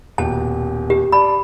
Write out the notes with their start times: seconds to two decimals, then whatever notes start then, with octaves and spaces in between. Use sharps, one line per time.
0.18 D#1 B2 G5 A5
0.90 G4
1.12 D5 A5 B5